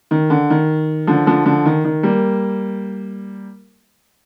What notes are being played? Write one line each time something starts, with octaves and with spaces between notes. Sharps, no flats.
D#3
D3
D#3
D3 F3
D3 F3
D3 F3
D#3
D#3
G3 A#3